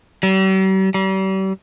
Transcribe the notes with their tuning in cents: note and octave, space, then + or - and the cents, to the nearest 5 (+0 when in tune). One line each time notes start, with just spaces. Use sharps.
G3 -45
G3 -40